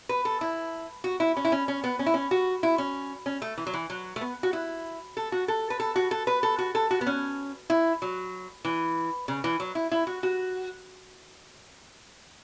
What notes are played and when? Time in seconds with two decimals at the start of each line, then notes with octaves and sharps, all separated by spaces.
0.09 B4
0.25 A4
0.41 E4
1.04 F#4
1.20 E4
1.37 C#4
1.45 E4
1.52 C#4
1.68 C#4
1.84 B3
1.99 C#4
2.06 E4
2.14 C#4
2.31 F#4
2.63 E4
2.78 C#4
3.26 C#4
3.42 A3
3.58 E3
3.67 F#3
3.74 E3
3.90 F#3
4.16 A3
4.21 B3
4.43 F#4
4.53 E4
5.17 A4
5.32 F#4
5.48 A4
5.70 B4
5.80 A4
5.96 F#4
6.11 A4
6.27 B4
6.43 A4
6.59 F#4
6.75 A4
6.91 F#4
7.01 B3
7.07 C#4
7.70 E4
8.02 F#3
8.65 E3
9.28 C#3
9.44 E3
9.60 F#3
9.75 E4
9.92 E4
10.07 F#4
10.23 F#4